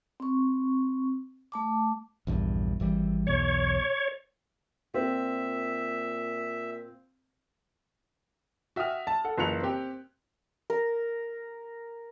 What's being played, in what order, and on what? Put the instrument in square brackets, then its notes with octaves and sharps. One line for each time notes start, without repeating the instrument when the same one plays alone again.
[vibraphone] C4 C#6
A3 A5 D6
[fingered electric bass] A#1 E2 G2
G#1 E3 G3
[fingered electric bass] B1 E2 B2 [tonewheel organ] C#5
[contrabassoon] A#2 [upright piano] C4 F4 [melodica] E5
[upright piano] F#4 E5 G5 D#6 F6
A5
A4 F#5
F#1 E3 F4 F#6 C#7 F7
C4 G4
[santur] A#4